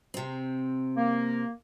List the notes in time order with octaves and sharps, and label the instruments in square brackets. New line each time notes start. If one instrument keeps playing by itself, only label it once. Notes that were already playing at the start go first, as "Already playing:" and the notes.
[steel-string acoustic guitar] C3 C4
[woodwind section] A#3